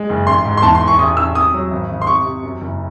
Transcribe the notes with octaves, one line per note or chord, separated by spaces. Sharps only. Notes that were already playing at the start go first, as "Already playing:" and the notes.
Already playing: G#3
F#1
A1 C6
G#2
C6
E2 A5
C6
E1
C#6
A1 D#6
A1 E6
C3 D#6
F#3
G#1
G#1
C6
C3 C#6
C3
F#2
F#1